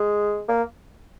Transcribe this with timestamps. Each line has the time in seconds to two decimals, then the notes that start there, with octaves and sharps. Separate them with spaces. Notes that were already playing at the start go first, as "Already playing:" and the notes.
Already playing: G#3
0.48 A#3